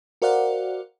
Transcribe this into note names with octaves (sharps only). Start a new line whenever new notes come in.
F#4 A#4 C5 D5 F5 F#5